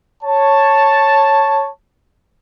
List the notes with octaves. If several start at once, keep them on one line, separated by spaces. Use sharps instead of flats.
C#5 A5